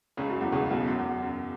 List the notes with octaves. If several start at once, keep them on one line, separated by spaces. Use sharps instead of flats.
C#2 C#3
F#2 F#3
E2 E3
C#2 C#3
B1 B2
F#2
E2
F#2
F#2